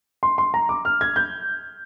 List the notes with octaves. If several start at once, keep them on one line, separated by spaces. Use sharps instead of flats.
C6
C6
A#5
D6
F6
G#6
G6